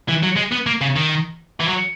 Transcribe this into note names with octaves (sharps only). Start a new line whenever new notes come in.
E3
F#3
G#3
B3
A#3
C#3
D#3
E3
F#3